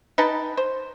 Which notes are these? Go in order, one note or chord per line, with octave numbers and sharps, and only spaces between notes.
D#4 B4 G5 A5
C5